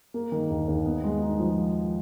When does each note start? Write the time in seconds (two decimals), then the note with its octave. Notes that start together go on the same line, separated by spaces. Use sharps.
0.14 A#3
0.32 D#3
0.50 D#2
0.68 D#2
0.86 B3
1.04 G#3
1.21 D#4
1.39 F3